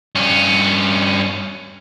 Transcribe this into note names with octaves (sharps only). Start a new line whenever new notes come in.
G2 C#4